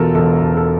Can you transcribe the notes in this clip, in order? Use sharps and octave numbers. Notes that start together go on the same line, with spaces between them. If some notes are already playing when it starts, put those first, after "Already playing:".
Already playing: E1 E2 B2 F4 A4 A#4
E1 A4
E1
A4